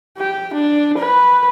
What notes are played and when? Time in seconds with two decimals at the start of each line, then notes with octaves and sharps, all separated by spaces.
0.18 G4
0.54 D4
0.98 B4